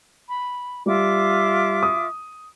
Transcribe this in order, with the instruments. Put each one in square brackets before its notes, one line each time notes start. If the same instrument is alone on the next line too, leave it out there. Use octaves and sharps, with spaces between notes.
[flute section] B5
[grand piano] G3 [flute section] F4 E5 D6
[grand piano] D#6